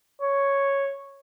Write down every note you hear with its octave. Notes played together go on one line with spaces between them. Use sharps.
C#5